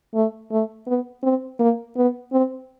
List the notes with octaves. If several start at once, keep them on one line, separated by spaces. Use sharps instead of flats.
A3
A3
B3
C4
A#3
B3
C4